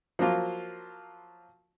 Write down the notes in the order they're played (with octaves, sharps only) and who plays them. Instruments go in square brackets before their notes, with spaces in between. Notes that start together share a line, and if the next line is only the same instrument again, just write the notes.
[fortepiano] F3 F#3 A#3 F4